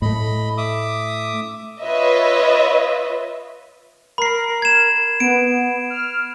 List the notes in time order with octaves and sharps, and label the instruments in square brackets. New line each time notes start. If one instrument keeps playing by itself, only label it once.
[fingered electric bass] A2 A3 [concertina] D#5 B5
[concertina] E5 D6 D#6
[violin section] F4 B4 C#5 D#5 E5
[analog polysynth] A#4 [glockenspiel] B5 C7
[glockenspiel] G#6 E7
[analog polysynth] B3 [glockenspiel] D7
[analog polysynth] F6